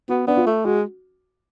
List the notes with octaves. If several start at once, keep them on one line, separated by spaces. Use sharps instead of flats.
B3 F#4
B3 D4
F4
A3
G#3 F#4